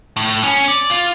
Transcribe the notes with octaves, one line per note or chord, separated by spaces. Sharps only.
A2
C#4
D5
F4